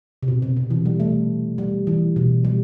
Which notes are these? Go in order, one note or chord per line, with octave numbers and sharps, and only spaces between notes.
C3
B2
C3
C3
E3
G3
A3
G3
E3
B2
G3